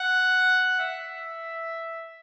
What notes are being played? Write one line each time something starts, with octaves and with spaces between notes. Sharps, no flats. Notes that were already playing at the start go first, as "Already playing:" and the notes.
Already playing: F#5
E5